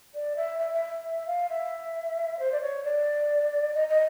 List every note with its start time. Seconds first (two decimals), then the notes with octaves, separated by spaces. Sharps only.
0.14 D5
0.36 E5
0.58 E5
0.73 E5
1.03 E5
1.26 F5
1.49 E5
2.39 C5
2.51 D5
2.60 C#5
2.83 D5
3.73 D#5
3.88 D#5